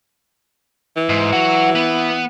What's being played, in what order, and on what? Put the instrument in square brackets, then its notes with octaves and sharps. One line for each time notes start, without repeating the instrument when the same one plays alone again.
[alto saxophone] E3
[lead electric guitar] G#2
F#3 F#4
B3